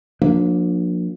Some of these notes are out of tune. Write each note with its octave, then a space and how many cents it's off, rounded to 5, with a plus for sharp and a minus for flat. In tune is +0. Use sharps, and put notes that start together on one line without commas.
F3 +40 A#3 +0 D4 +0